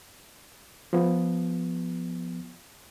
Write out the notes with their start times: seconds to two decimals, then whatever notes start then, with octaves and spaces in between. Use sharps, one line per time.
0.93 F3 B3